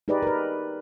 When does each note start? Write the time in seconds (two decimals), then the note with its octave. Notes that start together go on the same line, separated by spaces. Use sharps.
0.08 D#4 G4 G#4 B4 D5 D#5
0.23 A#4 B4